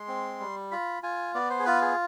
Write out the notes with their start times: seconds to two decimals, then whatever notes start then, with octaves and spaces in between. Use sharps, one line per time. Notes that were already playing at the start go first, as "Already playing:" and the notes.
Already playing: G#3 C6
0.08 C4
0.40 G3
0.71 F4 B5
1.03 F4 G#5
1.35 B3 D5
1.50 C5
1.60 G#4
1.66 F4 B4
1.82 G#4